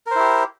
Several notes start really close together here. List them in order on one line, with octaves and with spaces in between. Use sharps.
A#4 C5 E4 G4